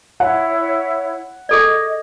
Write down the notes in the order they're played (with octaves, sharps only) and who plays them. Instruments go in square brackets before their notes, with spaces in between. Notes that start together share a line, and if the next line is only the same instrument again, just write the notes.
[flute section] E4 C#5 [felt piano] F#5
[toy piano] G#4 A4 D5 [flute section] D#5